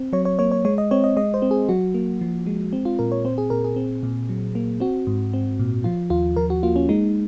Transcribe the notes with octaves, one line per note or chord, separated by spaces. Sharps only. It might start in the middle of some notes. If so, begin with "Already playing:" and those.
Already playing: C4
F#3 C#5
C#5
A#3 C#5
C#5
G#3 C#5
D#5
C4 C#5
D#5
G#3 D#5
C5
C4
G#4
F#3 F#4
A#3
F3
G#3
C4
F4
A#2 A#4
C#5
C4 C5
G#4
A#2 A#4
G#4
C4
A#2
F#3
A#3
C4 F#4
G#2
C4
A#2
F3 F4
D#2 F4
F3 A#4
F#4
A#3 F4
C#4
G#3 D#4